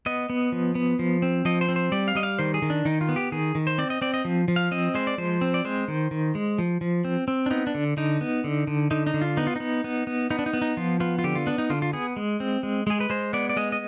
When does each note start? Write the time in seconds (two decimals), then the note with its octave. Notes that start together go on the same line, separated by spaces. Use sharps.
0.06 B3 D#5
0.30 B3
0.52 F3
0.75 B3
0.99 F3
1.22 C4
1.45 F3 D#5
1.61 C5
1.68 C4
1.76 C5
1.92 G3 D5
2.08 F5
2.15 G3 D#5
2.23 F5
2.39 D#3 C5
2.54 G#4
2.62 D#3
2.70 D4
2.85 D#3 D#4
3.01 F4
3.09 B3
3.16 G4
3.32 D#3 G#4
3.55 D#3
3.67 C5
3.78 C4 D5
3.90 D#5
4.02 C4 D5
4.14 D#5
4.25 F3
4.48 F3
4.56 F5
4.71 C4 D#5
4.94 G#3 C5
5.07 D5
5.18 F3 C5
5.41 C4
5.54 D5
5.65 G#3 C5
5.88 D#3
6.11 D#3
6.35 G#3
6.58 F3
6.81 F3
7.05 C4
7.28 C4
7.46 D4
7.51 B3 D#4
7.67 D4
7.75 D3
7.97 D3 D#4
8.21 B3
8.44 D3
8.67 D3
8.91 D3 D#4
9.07 D#4
9.14 D3
9.21 F4
9.37 B3 D#4
9.47 F4
9.56 B3 D#4
9.84 B3
10.07 B3
10.30 B3 D#4
10.39 D4
10.46 D#4
10.54 B3
10.62 D#4
10.77 F3 F4
11.00 B3 F4
11.19 F4
11.24 D3 G4
11.35 F4
11.47 B3 D4
11.58 D#4
11.70 D3 F4
11.82 F4
11.93 B3 G#4
12.17 G#3
12.40 C4
12.63 G#3
12.87 G#3 G#4
13.00 B4
13.10 G#3 C5
13.33 B3 D5
13.49 D5
13.57 G#3 D#5
13.72 D#5